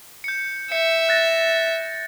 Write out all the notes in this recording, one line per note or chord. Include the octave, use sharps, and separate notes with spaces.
G6 C#7
E5 G6 C#7
F#6 A6 A#6